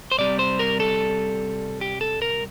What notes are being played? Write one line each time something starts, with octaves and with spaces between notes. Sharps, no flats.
C5
C2 C3 G3 D5
C5
A#4
A4
G4
A4
A#4